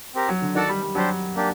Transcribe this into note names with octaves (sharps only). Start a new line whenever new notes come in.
C4 G4 A#4
F#3
D3
D#3 F#4 A4 D5 F#5 A5
G3
G3
F#3 D4 G4 C5
A#3 D4 G4